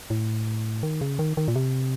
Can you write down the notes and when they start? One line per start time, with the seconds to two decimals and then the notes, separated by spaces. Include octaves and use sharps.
0.10 A2
0.83 D#3
1.01 C#3
1.19 D#3
1.37 D#3
1.48 A#2
1.56 C3